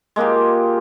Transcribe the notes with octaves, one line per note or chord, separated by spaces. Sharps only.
G#3 A#3 F4 G4